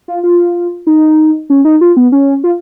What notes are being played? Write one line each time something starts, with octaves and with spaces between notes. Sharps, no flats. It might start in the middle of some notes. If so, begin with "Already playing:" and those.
F4
F4
D#4
C#4
D#4
F4
B3
C#4
F4